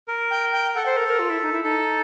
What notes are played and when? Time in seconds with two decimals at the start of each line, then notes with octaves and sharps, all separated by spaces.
0.08 A#4
0.30 G5
0.52 G5
0.75 A4 F#5
0.86 C5
0.97 A#4
1.08 A#4
1.19 F4
1.30 E4
1.42 D#4
1.53 E4
1.64 D#4 A4